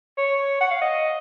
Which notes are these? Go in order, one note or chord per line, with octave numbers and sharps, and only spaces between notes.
C#5
F#5
F5
D#5